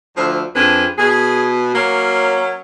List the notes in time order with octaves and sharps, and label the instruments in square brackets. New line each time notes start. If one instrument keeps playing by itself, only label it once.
[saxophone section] D2 D3 [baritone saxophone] F3
[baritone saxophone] F2 [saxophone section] D4 G#4 B4
[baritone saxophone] B2 [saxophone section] G#4
[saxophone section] F#3 C#4 [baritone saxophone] A#3